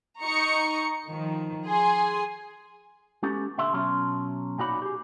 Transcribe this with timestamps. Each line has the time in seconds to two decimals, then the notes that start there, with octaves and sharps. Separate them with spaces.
0.21 D#4 A#5 C#6 C#7
1.05 D#3 F3
1.68 G#4 G#5 C6
3.23 G#3 B3 C#4 G4 A4
3.58 A#2 D3 E5 C6
3.73 B2 F#3 C#4 C6
4.59 A#2 D#4 F#4 C#5 D5 B5
4.82 G4 G#4